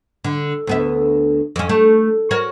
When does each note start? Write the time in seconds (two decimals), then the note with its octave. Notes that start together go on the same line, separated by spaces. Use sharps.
0.24 D3
0.67 D2 B3 E5
1.56 F2 C#4
1.69 A3
2.31 F#4 A#4 C#5